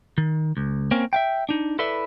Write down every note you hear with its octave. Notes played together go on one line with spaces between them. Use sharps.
D#3
C#2
A#3 C4 C#4 A#4
E5 F5 G5
D4 D#4
E4 A4 B4 D5 E5